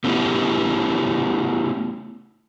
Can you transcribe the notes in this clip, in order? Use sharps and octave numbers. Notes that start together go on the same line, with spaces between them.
A3 B3 C#4 D#4 E4 G4